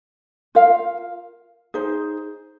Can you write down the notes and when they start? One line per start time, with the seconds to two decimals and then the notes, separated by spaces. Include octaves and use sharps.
0.55 F4 A#4 F5
1.74 D#4 G#4 C5